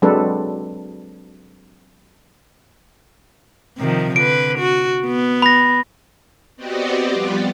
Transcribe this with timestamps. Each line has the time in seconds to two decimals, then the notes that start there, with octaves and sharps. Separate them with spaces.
0.02 F#3 G#3 C4 D4 A4 B4
3.78 C3 D#3 F3
4.16 D3 B4 D7
4.59 F#4
5.06 B3
5.42 B5 A#6
6.56 B3 C4 F#4 G4 D5 D#5
7.08 F3 G3 B3 F4 G4 D5